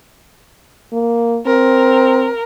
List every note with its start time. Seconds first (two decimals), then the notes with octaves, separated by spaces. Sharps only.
0.93 A#3
1.46 C4 A#4